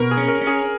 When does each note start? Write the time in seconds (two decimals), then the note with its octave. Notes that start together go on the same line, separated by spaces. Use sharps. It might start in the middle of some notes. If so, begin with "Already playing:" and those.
Already playing: B2 A#4
0.11 G#4
0.17 C#4
0.28 A#4
0.41 C#4
0.47 G#4